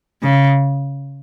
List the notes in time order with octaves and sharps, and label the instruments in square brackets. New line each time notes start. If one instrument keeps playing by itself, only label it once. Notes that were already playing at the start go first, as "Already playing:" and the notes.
[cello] C#3